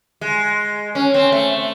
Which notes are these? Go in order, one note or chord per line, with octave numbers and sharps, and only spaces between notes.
G#3
C#4
C4
A3